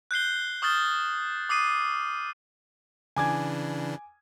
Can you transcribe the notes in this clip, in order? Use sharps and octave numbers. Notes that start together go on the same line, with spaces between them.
F#6 G6 C7 G7
C#6 D#6 F6 G6 A6 G7
D6 D#6 C7 D#7
C#3 E3 D4 G#5 D6 G#6